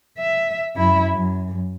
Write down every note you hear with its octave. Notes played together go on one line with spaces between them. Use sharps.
E5
F#2 E4
F#2